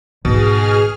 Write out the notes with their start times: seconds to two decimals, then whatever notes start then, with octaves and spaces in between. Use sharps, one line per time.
0.25 G#1 B2 G#4 F6